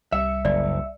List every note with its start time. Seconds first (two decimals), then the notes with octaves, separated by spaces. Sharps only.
0.13 C2 G3 E5 C#7
0.45 F#1 D5